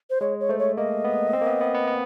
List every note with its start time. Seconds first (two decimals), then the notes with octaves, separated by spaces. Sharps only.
0.10 C5
0.21 G#3 C#5
0.40 C#5
0.49 A3 C5
0.59 C#5
0.77 A#3 D#5
1.04 B3
1.33 C4
1.41 A#3
1.46 B3
1.61 B3
1.74 B3
1.88 B3